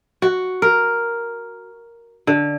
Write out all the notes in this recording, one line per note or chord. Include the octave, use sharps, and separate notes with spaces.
F#4
A#4
D3